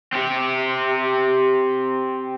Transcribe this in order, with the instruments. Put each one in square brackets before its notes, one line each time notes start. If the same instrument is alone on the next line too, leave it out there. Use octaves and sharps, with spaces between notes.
[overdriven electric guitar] C4 G4